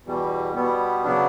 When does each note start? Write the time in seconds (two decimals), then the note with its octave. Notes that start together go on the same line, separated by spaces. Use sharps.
0.04 E2 B2 G3
0.55 B2 G3 B3
1.04 C#3 F#3 B3 D4